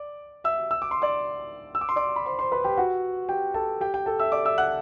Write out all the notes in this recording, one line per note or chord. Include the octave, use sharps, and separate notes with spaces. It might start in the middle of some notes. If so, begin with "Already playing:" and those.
Already playing: D5 D6
E5 E6
E6
D6
C6
D5 D6
E6
D6
C6
D5 D6
B5
C5 C6
C5 C6
B4 B5
G4 G5
F#4 F#5
G4 G5
A4 A5
G4 G5
G4 G5
A4 A5
E5 E6
D5 D6
E5 E6
F#5 F#6